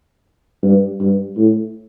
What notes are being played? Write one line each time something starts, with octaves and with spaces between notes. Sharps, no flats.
G2
G2
A2